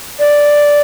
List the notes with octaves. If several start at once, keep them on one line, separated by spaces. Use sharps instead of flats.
D5